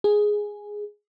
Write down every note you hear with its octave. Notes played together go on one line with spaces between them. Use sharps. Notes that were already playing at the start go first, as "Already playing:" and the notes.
G#4